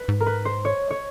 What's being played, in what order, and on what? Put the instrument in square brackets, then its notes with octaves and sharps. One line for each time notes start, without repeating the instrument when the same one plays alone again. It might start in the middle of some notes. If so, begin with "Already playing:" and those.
Already playing: [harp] B4
[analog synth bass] G#2
[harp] A#4
B4
C5
C#5
C#5